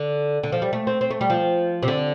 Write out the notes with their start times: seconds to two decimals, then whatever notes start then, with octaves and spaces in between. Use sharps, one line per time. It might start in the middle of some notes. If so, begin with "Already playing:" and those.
Already playing: D3
0.43 D3
0.52 F3
0.62 G3
0.73 A3
0.87 C4
1.01 C4
1.11 A3
1.21 G3
1.30 F3
1.83 C3
1.88 D3